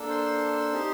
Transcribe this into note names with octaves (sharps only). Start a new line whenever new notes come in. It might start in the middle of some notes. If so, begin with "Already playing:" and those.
Already playing: A#3 D4 A4
C5 C6
C4 D#4 G4